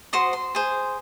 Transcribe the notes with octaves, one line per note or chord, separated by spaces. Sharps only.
F#4 C5 C6 D#6
C6
G#4 C5